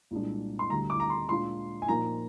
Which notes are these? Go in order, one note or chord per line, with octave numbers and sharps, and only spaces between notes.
C2 A#2 G#3 D4
C6
D2 D3 G3 A#5
D6
A#5
C6
A#2 G#3 D4 F4 C6
G#5
A#2 F3 A#3 D#4 A#5